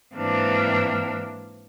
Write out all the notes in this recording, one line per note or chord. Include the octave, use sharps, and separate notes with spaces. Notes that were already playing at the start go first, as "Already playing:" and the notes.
G#2 E3 A#3 C4 D4